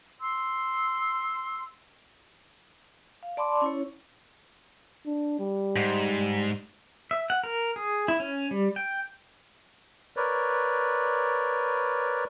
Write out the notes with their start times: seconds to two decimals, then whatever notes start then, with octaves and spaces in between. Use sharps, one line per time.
0.22 C6 E6
3.23 F5
3.37 D5 A5 B5 C6 D6
3.62 C#4 E4 C#5
5.06 D4
5.40 G3
5.76 G#2
7.11 E5
7.30 F#5
7.44 A#4
7.76 G#4
8.08 E4
8.20 C#4
8.51 G3
8.76 G5
10.16 A#4 B4 C#5 D5